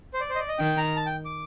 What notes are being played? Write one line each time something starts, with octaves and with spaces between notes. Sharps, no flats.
C5
D5
C5
D#5
D5
D#5
D#3 G5
A#5
A5
G5
D6